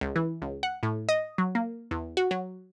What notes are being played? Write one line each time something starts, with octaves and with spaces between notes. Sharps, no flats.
C#2
E3
C#2
F#5
A2
D#5
F#3
A#3
E2
F#4
F#3